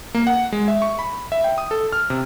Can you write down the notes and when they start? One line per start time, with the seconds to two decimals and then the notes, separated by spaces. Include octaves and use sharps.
0.15 A#3
0.27 F#5
0.52 G#3
0.68 E5
0.82 C#6
0.99 B5
1.32 E5
1.44 G5
1.58 D#6
1.71 A4
1.93 F6
2.10 C3